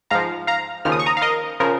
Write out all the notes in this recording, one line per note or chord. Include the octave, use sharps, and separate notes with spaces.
G#2 F3 F5 A#5
F5 A#5
D#2 C#3 F3 F6
D#6
C#6
A#5 D#6
F5
A#4 D#5
C#3 F3 A#4